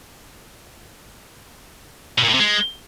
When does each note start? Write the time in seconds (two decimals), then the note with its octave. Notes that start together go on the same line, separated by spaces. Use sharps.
2.18 B2
2.23 A#2
2.29 A2
2.34 C3
2.40 G#3